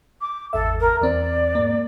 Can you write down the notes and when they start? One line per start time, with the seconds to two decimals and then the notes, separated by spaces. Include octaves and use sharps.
0.21 D6
0.53 G#1 E2 A4 E5
0.80 A#4
1.01 E2 C4 D5
1.55 G#2 A#3